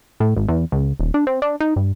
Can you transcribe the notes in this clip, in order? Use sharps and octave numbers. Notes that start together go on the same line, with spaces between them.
A2
G#1
E2
C#2
D#1
D4
C4
D4
D#4
G2